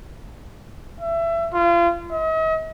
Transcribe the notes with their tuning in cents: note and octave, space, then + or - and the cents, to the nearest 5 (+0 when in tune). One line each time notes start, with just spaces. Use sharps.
E5 +25
F4 -30
D#5 +45